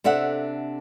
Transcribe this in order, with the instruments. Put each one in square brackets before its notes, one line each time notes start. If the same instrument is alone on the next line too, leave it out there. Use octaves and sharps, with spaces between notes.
[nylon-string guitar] C3 D4 A4 E5 F#5